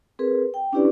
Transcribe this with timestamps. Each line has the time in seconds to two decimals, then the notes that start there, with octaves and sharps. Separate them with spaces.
0.19 C4 G#4 A#4 B4
0.54 G5
0.72 C#4 D4 E4 G4 B4 D5